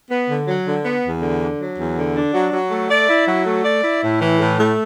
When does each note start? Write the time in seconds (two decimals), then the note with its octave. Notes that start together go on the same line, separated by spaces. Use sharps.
0.11 B3
0.29 D3
0.48 F#3
0.66 D3
0.85 B3
1.04 E2
1.22 D3
1.40 D4
1.60 F#3
1.78 E2
1.96 D3
2.16 D4
2.34 F#3
2.53 F#3
2.71 A3
2.90 D5
3.09 E4
3.27 F#3
3.46 A3
3.65 D5
3.83 E4
4.02 A2
4.21 E3
4.40 A2
4.58 A3